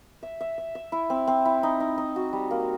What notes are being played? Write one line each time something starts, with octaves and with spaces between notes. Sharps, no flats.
E5
E5
E5
E5
E4
C4
C4
E4
D#4
D#4
D#4
F#4
G3
A#3